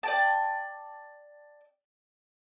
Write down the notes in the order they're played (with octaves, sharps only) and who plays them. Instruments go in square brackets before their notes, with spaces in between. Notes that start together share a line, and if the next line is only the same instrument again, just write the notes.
[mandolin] D5 G5 A5